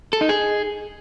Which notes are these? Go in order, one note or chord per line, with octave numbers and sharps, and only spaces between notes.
A4
D#4
G#4